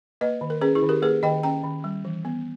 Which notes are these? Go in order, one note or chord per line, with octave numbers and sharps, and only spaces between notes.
A#3 B4 D#5
D#3
A#4
C#4 G#4 B4
E4 G#4
D#3
G4 A#4
A#3 G#4 B4
D#3 D#5 G5
C#4 G5 A#5
D#3
G3
E3
B3